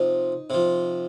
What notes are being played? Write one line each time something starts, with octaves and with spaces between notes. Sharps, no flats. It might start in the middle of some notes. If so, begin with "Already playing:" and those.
Already playing: C3 F3 D#4
C3 F3